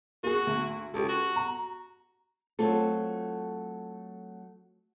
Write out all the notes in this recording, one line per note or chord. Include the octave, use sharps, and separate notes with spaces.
A#3 F#4 G#4
D2
C#2 G4 A4
F#4
A#5
F#3 A3 C4 F4 A4